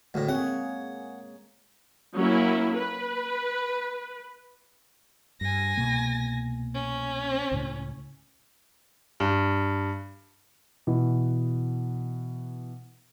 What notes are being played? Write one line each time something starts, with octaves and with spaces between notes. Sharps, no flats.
D2 A2 G#3
A#3 C4 G#4 C#5 F#5
F#3 A#3 C#4 E4
B4
G2 G#5 A#6
C2 B2 A#3
C#4
C#2 A2 C#3
G2
B2 E3